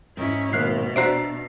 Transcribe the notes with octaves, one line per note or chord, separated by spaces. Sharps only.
G#2 C#4 E4
G#1 B2 A#3 F6 F#6 C7
D4 F#4 C5 D5 E5 A#5 C7